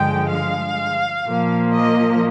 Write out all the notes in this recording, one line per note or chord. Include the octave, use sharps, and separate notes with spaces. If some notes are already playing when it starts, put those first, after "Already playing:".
Already playing: G2 D3 F3 G#3 G5
F5
A#2 F3 A#3
D#5